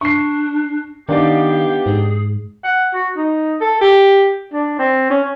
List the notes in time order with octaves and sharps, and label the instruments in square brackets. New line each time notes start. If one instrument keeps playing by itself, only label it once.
[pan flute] D4 [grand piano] C#6 C7
[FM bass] D#3 [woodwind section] B3 G4 [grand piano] D4 D#4 D5 [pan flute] F5
[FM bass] G#2 [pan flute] G#4
[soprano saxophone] F#5
F#4
D#4
A4
G4
D4
C4
C#4